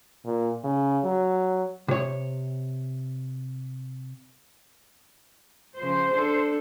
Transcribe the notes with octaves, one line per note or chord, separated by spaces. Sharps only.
A#2
C#3
F#3
C3 C#5
C#3 F3 C5
D4 A4